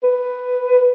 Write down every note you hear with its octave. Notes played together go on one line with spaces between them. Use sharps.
B4